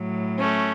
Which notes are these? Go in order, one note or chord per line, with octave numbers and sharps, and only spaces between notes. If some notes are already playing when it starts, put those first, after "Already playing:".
Already playing: A2 F#3
A3 C#4